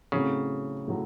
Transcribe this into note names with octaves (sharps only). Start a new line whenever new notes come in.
A2 C#3 F#3 A3 C4
A2 F#3 A3